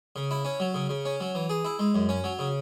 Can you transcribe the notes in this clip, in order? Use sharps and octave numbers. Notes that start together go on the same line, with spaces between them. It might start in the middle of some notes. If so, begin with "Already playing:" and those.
C#3
E4
C#4
F#3
C#3
C#3
C#4
F#3
E3
G#4
E4
G#3
F#2
C#4
F#3
C#3